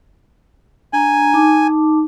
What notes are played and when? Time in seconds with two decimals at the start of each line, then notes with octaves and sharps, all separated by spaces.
0.93 D4 G#5 A#5
1.34 D#4 A5 D6